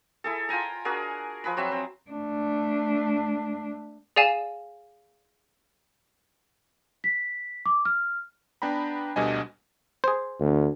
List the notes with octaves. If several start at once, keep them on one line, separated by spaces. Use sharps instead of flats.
E4 G#4 A4
F4 G5 G#5 A#5
D4 F#4 G#4 A#4
F3 G#4 B4 B5
F#3 C4 E5
C4
A3 D4
G#4 D5 F5 G#5 E7
B6
D6
F6
B3 D4 G5 A#5 B5
D2 B2 D3 G3 D#5 G#5
G#4 C5
D2